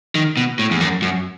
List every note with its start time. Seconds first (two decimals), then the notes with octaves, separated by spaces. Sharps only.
0.15 D#3
0.37 B2
0.59 A2
0.71 E2
0.81 F#2
1.02 F#2